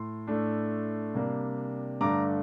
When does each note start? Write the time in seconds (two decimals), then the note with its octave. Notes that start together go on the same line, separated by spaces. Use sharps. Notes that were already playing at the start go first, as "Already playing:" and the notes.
Already playing: A2 C6
0.27 A2 A3 D4
1.14 C3 G3 A#3 D4
2.01 G2 D3 A3 D4 A#5 D6